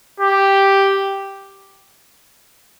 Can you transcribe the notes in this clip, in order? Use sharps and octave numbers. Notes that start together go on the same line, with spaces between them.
G4